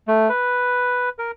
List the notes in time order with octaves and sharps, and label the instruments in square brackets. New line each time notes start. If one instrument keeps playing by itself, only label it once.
[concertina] A3
B4
A#4